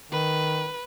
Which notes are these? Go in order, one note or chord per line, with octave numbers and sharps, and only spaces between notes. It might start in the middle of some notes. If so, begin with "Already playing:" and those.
D#3 B4